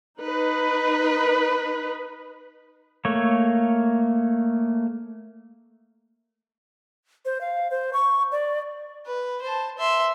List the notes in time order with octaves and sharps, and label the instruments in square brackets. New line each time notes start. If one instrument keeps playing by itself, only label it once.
[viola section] D#4 B4
[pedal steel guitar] A3 A#3 C#5
[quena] C5
F5
C5
C#6
D5
[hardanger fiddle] B4
C5 A5
E5 C6